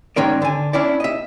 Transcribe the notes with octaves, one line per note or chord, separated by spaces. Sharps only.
G#2 D#3 C#4 A#4 D5
D3 G#5
C#4 D4 E4 D5
D#5 E5